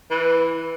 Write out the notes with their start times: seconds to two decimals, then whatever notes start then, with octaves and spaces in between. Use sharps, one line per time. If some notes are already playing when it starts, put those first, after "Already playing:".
0.10 E3